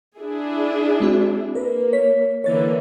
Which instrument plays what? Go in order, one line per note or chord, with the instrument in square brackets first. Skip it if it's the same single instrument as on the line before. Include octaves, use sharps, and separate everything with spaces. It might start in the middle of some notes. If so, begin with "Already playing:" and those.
[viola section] D4 E4 G#4
[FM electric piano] G#3 C4 F#4
[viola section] A#3 [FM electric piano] A#4 B4
[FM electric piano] C#5 B6
[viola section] D3 E3 A#3 [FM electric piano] C#5 A6